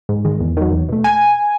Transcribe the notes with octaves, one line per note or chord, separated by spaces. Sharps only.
G#2
D#3 G#3
E2
D#3 F#3
E2
B2 A3
G#5